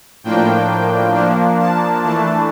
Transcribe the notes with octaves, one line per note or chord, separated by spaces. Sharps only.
A2 F3 A#3 D4 G5
F3 A#3 D4
A5
E3 A3 D4 A5